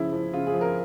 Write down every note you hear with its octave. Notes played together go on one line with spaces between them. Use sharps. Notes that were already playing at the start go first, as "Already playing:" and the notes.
Already playing: C#3 F3 E4
F3
C#3 F4
G#4
F3
A#4